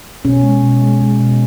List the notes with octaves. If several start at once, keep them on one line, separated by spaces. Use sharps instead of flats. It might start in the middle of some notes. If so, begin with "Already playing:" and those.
B2 C#4
G#3
B2
G#3
G#3
B2